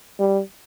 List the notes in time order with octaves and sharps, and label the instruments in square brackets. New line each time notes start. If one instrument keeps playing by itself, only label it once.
[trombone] G3